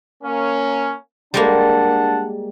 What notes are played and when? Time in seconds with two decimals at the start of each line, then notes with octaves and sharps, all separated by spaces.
0.23 A#3 C#4
1.34 G3 G#3 A#3 D4 F#5 A5